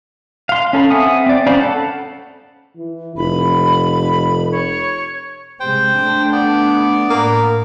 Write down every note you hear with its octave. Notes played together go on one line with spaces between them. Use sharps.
F5 C6
C#4 A4 F5 B5
C4 E5 F#5 G#5 D#6
C4 D5
C#4 C5 D5 F5 B5
A4 F#5 A5
E3
F1 B5
C#5
C3 G#3 C5 G5
A3 D4
B3 D5
A2 A#3